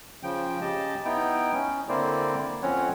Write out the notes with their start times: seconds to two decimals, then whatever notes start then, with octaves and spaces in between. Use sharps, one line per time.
0.23 C#3 F3 G5
0.61 C#3 G4 D#5 A5
1.05 B3 D#4 E4 G5
1.54 C#4
1.89 D3 A#3 C4 E4 C5 D5
2.62 F2 C4 C#4 C#5 F#5